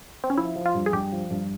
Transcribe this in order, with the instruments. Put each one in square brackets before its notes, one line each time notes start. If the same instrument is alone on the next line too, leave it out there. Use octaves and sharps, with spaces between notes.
[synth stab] C4
C#4
[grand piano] F3 [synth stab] E4
[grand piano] F3
[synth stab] F4
[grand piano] G2
[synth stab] G#4
[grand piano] G2 [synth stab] G4
[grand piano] F3
G2